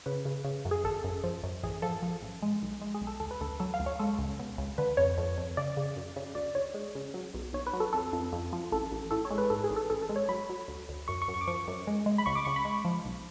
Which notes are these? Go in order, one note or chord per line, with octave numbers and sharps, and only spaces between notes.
C#3 B4
C#3
C#3
F#2
G#4
G#1 A4
F#2
F3
F#2
A1 G#4
F3 A4
F3
A1
G#3
B1
G#3
G#4
B1
A4
D2 A4
B4
D2 A4
F#3 A4
F5
D2
C#5
G#3 A4
C#2
B2
C#2
D3 B4
F2 C#5
F2
F2
C#3 D5
C#3
F#2
C#3
D2 D5
D2 C#5
G#3
C#3
F#3
B1
B1 C#5
B4
F#3
A4
F2 A4
F2
F2
F3
A1 A4
A1
A2 A4
C#5
G#3
B4
G#2 A4
G#4
A1
A4
A1 A4
A4
G#3
C#5
F#3 B5
F#3
D2
D2
F#2 C#6
C#6
F#2
C#6
D6
F3 C#6
F#2
G#3
G#3
B5
C#2 C#6
D6
C#2 C#6
B5
G#3
F3
B1